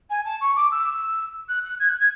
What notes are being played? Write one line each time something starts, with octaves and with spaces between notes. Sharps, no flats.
G#5
A5
C#6
D6
E6
F#6
F#6
G#6
F#6
G#6